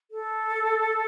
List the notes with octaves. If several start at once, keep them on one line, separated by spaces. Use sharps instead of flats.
A4